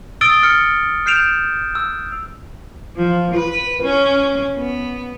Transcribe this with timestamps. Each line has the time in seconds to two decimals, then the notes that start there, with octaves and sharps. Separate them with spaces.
0.21 D#6 E6 A6 D7 G7
0.43 F6 C#7
1.06 F6 G6 C7 D7 E7 F7
1.75 E6
2.96 F3
3.35 B4
3.83 C#4
4.57 B3